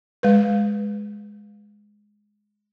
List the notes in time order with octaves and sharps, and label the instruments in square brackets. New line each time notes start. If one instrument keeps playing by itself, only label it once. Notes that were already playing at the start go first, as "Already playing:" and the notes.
[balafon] G#3 B4